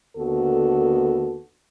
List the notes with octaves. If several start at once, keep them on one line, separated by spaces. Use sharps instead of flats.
D#2 D3 B3 F#4 A4